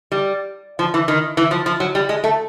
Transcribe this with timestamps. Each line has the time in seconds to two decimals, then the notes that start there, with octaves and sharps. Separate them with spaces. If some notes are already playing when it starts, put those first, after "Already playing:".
0.12 G3
0.79 F3
0.94 E3
1.08 D#3
1.37 E3
1.51 F3
1.66 F3
1.80 F#3
1.95 G3
2.09 G#3
2.24 A3